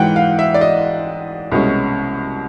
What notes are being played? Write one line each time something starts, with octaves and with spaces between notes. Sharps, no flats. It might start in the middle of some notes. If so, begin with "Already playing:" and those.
Already playing: G#2 E3 G#3 F#5 G5
F5
E5
D5
D#5
C2 B2 G#3 C#4